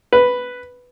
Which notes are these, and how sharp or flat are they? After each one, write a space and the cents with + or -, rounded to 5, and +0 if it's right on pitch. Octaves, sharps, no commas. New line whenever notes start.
B4 +0